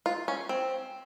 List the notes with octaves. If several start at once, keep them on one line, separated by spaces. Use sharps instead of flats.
F4
C#4
C4